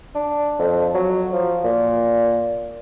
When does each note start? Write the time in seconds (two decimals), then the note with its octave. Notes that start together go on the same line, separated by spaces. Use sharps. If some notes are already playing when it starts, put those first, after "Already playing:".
0.15 D4
0.59 F2
0.95 F#3
1.33 F3
1.64 A#2